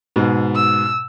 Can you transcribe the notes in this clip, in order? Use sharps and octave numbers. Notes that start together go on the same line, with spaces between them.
G#2 B2
E6